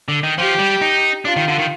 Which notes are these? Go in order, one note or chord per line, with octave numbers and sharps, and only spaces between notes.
D3
D#3
F3 G4
G3
D#4
D4 F4
D#3
D3
D#3